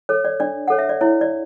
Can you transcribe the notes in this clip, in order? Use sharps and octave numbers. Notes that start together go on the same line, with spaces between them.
A4 C#5
D5
D4 D5
A4 C#5 F#5
E5
D5
E4 C#5
D5